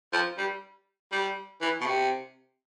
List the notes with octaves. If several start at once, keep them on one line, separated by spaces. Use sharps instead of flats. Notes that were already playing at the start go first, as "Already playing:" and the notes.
F3
G3
G3
E3
B2
C3